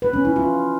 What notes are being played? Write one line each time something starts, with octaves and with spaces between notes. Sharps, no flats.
B4
C#4
E4
F4